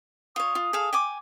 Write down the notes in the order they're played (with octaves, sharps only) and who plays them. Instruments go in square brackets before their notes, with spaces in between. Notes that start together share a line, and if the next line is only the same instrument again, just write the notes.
[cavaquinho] F4 C#5 [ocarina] D#6
[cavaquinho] F4
G#4 A4 F5
G5 G#5 D6